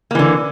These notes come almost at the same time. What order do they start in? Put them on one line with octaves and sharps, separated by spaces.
A#3 E3 D3